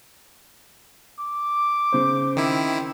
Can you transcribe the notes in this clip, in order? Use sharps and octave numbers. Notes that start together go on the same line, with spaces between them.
D6
C#3 C5
D#3 C4 E4